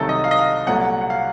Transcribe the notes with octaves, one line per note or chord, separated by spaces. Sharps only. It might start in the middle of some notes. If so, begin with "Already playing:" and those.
Already playing: C2 C3 D#3 F#3 A3 A4
D#5
F5
D#5
F5
C2 A#2 F#3 A3 F#5
F#5
F5